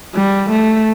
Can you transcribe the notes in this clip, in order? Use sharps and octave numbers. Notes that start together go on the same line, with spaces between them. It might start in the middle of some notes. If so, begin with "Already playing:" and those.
G3
A3